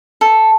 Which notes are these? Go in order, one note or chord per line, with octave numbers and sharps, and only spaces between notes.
A4